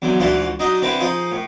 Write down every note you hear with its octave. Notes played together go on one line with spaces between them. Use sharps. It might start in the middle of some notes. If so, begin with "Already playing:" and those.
E2 D3 F#3
D2 G#2 E3 D4 F4 F#4
F#3 D4 D#4 D#5
D3 C4 E4 B4 D6
F3 D#4 F4 G#4
A2